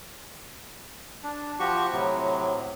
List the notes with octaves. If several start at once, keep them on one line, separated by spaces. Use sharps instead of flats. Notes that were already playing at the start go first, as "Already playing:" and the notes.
D4
F3 F#4 G4 C#6
A2 C3 F#3